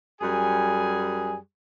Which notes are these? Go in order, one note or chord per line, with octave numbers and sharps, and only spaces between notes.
F#2 G3 G#4 G#5